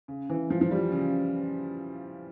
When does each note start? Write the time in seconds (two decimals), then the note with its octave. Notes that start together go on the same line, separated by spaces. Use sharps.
0.08 C#3
0.29 E3
0.50 F3
0.61 F3
0.71 G3
0.92 C#3